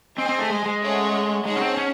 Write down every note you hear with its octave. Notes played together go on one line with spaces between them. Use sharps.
C4 G#4 C5 D#5 G#5
C4
A3
G#3
G#3
A3 C#4 G#4 C#5 F#5
G#3 D#4 G#4 C#5 F#5 A5
C#4
C4
C#4